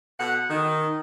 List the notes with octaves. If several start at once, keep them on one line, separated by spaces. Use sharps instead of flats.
B2 A4 F#5
D#3